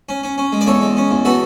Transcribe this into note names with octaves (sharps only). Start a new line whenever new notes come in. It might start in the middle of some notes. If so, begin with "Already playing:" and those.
C#4
C#4
C#4
G#3
D5
E2 A4 C#5
G#3
C#4
E2
B3 F#4 A4